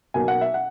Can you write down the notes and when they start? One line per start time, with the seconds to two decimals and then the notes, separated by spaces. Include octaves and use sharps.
0.14 B1 B2 A#3 G#5
0.28 F#5
0.41 E5
0.54 F#5